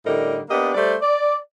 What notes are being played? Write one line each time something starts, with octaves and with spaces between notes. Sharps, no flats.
A2 D3 G3 D#4 A#4
A#3 B3 D4 G4 D#5
G3 A3 C5 D5
D5